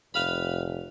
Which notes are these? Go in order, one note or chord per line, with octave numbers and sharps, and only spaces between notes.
F1 B4 F5 B5